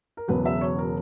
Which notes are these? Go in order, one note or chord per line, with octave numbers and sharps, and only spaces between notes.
A#4
E1 E2 C#3 F#3 B4
E5
C#5
A#4